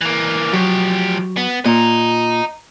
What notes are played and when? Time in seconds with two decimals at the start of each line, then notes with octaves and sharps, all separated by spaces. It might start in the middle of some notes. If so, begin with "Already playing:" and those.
0.01 E3 A#3
0.53 F3 F#3 G4
1.37 B3
1.66 A#2 D#5 A#5